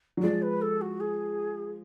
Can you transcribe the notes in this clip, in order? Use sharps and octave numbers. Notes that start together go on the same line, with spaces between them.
F#3
F3 G#3 D5
B4
A4
F#4
G#4